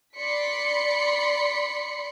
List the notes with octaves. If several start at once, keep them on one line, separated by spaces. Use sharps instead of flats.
D5 B5 C6 B6 C#7